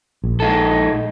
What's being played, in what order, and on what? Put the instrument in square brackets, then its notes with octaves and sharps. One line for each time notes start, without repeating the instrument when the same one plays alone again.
[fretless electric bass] A#1
[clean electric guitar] G#3 D#4 A4